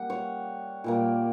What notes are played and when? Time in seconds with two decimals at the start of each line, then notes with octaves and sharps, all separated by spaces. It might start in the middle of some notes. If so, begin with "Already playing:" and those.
Already playing: G3 A#3 F#5
0.10 C#5
0.84 A#2 G3 A#3